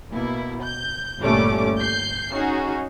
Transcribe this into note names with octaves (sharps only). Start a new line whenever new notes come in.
B2 A#3 E4
G6
G1 A#2 G3 A3 C#4 D6
G6 C7
C#4 D#4 F#4 G#4